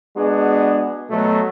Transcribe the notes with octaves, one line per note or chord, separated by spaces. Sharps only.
G#3 B3 D4 F#4 G#4
B2 F#3 A3